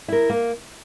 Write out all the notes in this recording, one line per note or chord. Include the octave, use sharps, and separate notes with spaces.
E4 A#4
A#3